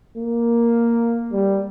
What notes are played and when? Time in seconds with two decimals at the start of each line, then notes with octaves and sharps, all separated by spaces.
0.18 A#3
1.33 G3